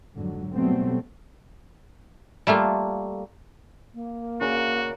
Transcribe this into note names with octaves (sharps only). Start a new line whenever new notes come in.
F2 G#2 D3 F#3
B2 F#3 G3 A3 B3 C4
G3 A3 A#3 F4
A#3
C#3 F#4 A#4 D5